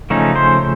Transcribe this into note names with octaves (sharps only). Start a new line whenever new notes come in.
C#3 F3 A3 C#4 D#4
C5